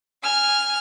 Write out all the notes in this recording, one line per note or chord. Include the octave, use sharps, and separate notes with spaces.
G#5 F6